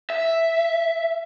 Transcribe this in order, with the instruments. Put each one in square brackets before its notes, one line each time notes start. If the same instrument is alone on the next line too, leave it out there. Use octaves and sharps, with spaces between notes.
[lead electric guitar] E5